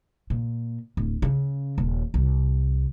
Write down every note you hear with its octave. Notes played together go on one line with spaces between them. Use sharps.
A#2
D1
C#3
D#1
C2